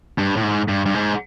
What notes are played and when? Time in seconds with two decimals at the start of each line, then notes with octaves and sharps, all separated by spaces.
0.18 G2
0.37 A2
0.43 G#2
0.68 G2
0.86 G2
0.94 G#2